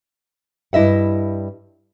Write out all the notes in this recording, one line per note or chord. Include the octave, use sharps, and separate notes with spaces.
G2 E4 D#5 E5 F#5